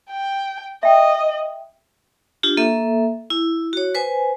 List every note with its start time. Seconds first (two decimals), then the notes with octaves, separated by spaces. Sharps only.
0.10 G5
0.83 D#5 E5 G5
2.43 D4 F4 G4
2.57 A#3 A4 E5
3.30 E4
3.73 F#4 C#5
3.95 B4 C5 G#5